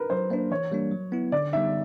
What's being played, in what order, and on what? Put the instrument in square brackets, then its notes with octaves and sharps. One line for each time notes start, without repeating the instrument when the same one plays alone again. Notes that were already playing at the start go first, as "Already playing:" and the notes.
Already playing: [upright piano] A#4 B4
[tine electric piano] F#3 [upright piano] C5
[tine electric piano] A#3 D4 [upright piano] C5
[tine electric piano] E3 [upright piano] C#5
[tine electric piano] G3 A#3 D4
F#3
B3 E4
[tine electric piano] D3 [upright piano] D5
[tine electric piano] G3 B3 D#4 [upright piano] E5